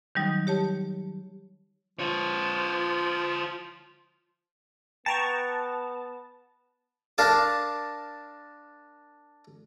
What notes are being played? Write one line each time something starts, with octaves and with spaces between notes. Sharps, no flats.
D#3 F#3 G3 D#4
G4 C#5 A5
F3 F4 C#5
B3 G5 A5 A#5 C#6
D4 A#4 F5 A5 D6